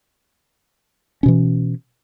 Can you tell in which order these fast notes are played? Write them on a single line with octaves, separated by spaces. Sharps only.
C#4 B2 E3